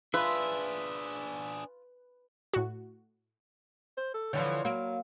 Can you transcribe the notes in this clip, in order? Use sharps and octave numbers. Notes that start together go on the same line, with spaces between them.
D4 F4 G#4 B4 E5
A2 F#4
C5
A4
D3 E3 F3 C#5
F#3 A#3